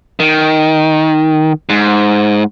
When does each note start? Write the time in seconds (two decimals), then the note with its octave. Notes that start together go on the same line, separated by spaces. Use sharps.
0.20 D#3
1.69 G#2